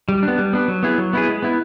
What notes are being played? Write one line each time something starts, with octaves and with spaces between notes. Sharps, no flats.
G3
D4
B3
G3
B3 D4
F#3
B3 E4 G#4
F#3
B3 E4 G#4
G#3
B3 E4